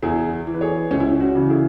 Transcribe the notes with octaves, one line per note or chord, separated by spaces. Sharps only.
E2 E4 G#4
E3
B4
G#4 C#5
C#2 C#4
E4
C#4
C#4 F#4
C#3 E3
E4 G#4